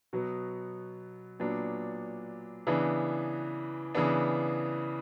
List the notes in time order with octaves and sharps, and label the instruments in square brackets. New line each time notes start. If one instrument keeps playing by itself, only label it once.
[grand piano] B2 F#3 B3
A#2 F#3 B3 D4
C#3 E3 B3 D4
C#3 E3 B3 D4